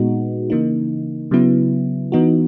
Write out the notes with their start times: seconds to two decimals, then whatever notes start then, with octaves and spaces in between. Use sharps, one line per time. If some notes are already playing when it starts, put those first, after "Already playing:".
Already playing: A#2 G#3 B3 D#4 F#4
0.50 C#3 E3 A#3 D#4
1.31 C#3 F#3 B3 E4
2.12 E3 B3 D#4 F#4